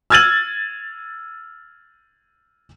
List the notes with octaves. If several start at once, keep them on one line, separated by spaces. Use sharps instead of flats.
E6 F6 G#6 A6 D#7 F#7